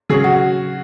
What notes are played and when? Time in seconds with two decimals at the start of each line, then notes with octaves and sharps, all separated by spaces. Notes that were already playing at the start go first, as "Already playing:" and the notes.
0.09 C#3 F#3 C#4 G#4
0.24 F#4